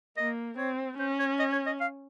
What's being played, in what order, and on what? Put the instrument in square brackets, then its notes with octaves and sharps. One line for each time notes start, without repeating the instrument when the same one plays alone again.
[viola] A#3 [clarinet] D#5
[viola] C4 [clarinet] C#5
[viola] C#4 [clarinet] C5
[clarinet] C#5
D#5
C#5
D#5
F5